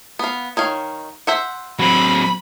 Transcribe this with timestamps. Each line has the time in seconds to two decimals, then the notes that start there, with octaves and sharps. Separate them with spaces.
0.19 B3 F5
0.57 D#3 C#5 F5
1.27 C5 E5 F#5
1.79 F#3 C4 B5